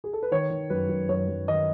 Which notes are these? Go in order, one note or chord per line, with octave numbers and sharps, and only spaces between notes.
G#4
A4
B4
D#3 C#5
D#3
F#2 B4
F#2
F#2 C#5
F#2
D#3 D#5